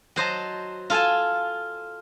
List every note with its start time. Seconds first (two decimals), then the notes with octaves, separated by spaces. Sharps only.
0.16 F#3 C5 D#5 A5
0.90 F4 A4 G#5 A5